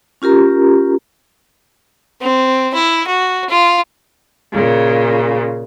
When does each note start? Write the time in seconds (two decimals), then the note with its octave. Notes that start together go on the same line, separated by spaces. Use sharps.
0.22 C#4 F4 G4 A#4 A#5
2.21 C4
2.74 E4
3.07 F#4
3.49 F4
4.52 A#2 C#3